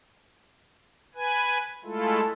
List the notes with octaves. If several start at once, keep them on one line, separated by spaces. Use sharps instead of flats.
B4 G#5
G#3 A3 E4 F4 A4